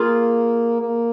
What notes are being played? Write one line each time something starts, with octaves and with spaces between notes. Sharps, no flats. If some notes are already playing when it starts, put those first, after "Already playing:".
Already playing: A#3 F4 G#4
A#3